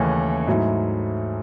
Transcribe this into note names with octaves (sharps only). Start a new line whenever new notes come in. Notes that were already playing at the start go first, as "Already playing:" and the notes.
Already playing: D#2 C#3 E3 A3 C#4
G#2 F#3 A3 E4